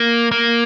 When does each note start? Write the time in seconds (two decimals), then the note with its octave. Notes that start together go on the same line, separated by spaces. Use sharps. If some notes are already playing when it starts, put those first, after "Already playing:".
Already playing: A#3
0.31 A#3